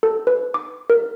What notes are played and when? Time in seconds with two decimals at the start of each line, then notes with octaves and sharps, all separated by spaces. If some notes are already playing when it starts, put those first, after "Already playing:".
0.03 A4
0.27 B4
0.54 D6
0.90 A#4